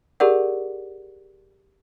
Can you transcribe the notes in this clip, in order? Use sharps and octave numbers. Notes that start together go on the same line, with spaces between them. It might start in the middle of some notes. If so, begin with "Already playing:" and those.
G4 G#4 A#4 D5 F#5